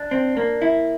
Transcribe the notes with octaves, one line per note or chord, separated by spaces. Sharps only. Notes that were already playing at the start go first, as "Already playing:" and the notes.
Already playing: D4
C4
A#3
E4